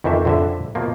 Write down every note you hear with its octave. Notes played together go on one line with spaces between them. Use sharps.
F2 D#3 E3 C4 E5
F2 D3 E5
B2 F3 A#3